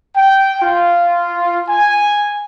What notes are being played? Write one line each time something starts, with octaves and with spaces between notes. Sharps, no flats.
G5
F4
G#5